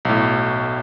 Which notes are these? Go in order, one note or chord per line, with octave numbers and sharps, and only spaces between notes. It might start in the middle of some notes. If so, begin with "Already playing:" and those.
B1 A2